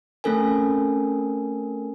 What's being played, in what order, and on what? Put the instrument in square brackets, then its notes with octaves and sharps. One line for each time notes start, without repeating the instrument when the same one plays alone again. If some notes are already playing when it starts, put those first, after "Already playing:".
[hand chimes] A3 C4 C#4 A4 A#4 G#5